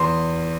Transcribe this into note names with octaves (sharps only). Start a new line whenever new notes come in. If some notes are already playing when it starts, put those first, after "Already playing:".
Already playing: E2 C6